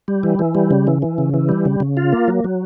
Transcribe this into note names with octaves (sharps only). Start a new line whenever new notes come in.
G3
E3
E3
G3
C#3
E3
E3
C#3
E3
G3
C#3
C#3
F4
A#3
F#3
F#3